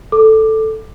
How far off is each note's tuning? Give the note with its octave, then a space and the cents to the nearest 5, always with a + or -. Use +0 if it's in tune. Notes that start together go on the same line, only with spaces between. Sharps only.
A4 +0 D6 +15